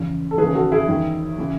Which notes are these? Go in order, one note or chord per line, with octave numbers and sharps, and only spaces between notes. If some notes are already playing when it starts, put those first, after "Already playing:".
Already playing: E2 C#3 E3
A4
D#2 C#3 E3 G#4 B4
F#4 A4
E4 G#4
E2 D#3
C#3 E3